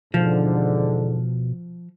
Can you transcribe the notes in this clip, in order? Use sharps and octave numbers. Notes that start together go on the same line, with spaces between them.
E2 G#2 B2 D3 F3